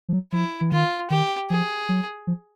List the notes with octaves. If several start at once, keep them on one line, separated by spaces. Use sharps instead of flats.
F3
F#3
F3 E4
E3
D#3 F4
D#3 G4
F3 G#4
F#3
F3